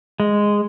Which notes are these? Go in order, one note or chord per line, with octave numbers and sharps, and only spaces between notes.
G#3